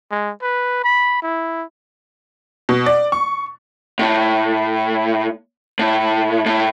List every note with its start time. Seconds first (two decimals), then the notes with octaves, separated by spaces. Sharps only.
0.11 G#3
0.42 B4
0.84 B5
1.23 E4
2.69 B2
2.86 D5
3.12 C#6
3.99 A2
5.79 A2
6.46 A2